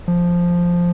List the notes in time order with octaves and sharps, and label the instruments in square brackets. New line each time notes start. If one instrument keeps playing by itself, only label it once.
[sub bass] F3